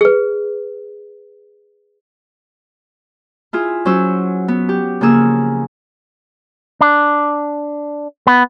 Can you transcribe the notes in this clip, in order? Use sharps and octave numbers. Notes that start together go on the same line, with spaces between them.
G#4 B4
E4 F4 G#4
F#3 C#4 C5 E6
B3
G4
C#3 F3 A#3 G#4 E6
D4
B3